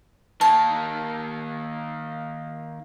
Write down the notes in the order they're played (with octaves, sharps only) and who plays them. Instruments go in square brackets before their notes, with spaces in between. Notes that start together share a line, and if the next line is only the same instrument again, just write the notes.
[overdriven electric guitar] D#3 A#3 [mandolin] A5